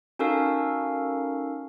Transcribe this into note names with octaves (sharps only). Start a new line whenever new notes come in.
C#4 D#4 F#4 A4 A#4 F5